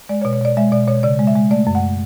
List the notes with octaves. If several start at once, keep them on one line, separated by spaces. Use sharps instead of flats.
G#3 D5
C#5
B2
C#5
B2 D5
G#3 E5
B2 D5
B2 C#5
C#3 D5
G#3
E5
G#3
A3 D5
F#2
F#5